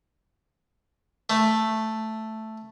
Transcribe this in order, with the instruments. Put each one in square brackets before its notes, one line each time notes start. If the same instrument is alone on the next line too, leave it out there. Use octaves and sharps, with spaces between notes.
[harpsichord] A3